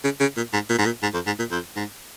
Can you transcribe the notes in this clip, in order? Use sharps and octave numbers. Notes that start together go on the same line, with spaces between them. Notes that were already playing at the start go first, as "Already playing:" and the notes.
C#3
C#3
A#2
G#2
A#2
G#2
A#2
G#2
F2
G#2
A#2
F2
G#2